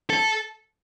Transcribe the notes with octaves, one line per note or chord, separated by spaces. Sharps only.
A4